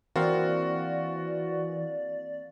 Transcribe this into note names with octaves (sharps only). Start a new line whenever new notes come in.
E3 A#3 C4 F#4 D5 F5